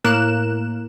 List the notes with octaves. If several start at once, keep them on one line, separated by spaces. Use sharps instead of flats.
A2 A#3 A#4 F#6 E7